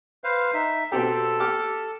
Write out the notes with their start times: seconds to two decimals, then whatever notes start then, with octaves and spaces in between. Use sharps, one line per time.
0.24 B4 C5 F5
0.54 D#4 E5
0.92 B2 C4 G4 A4 E6
1.39 G4 D6 F6